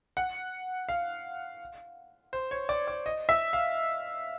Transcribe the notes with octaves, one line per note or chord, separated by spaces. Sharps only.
F#5
F5
C5
C#5
D5
D5
D#5
E5
F5